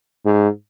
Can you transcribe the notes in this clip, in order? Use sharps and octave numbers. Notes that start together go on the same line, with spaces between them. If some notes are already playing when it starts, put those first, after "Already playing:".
G#2